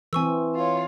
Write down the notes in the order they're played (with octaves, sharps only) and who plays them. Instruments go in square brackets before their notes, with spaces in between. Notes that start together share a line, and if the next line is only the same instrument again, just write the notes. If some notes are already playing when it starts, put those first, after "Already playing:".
[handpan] E3 C4 [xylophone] G#5 C#6 E6
[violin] F4 C#5